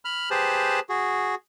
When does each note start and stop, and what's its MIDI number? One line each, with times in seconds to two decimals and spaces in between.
0.05 0.29 83
0.05 0.29 89
0.31 0.80 67
0.31 0.80 68
0.31 0.80 71
0.31 0.80 72
0.31 0.80 81
0.89 1.35 66
0.89 1.35 68